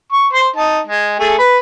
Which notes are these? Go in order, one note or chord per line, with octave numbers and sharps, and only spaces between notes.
C#6
C5 C6
D#4 A5
G#3
A3 G#4 A4
B4